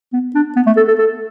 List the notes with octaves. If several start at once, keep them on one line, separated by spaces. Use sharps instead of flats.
B3
D4
B3
A3
A4
A4
A4